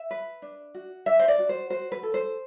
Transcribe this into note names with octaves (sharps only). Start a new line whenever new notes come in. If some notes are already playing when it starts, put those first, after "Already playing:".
Already playing: E5
B4
D4
F#4
D4 E5
C5
D5
F#4
C5
F#4 C5
B4
A4
C5